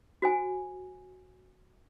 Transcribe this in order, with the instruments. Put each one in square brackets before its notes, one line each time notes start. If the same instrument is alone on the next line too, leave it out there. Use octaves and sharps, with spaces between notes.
[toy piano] F#4 C5 G#5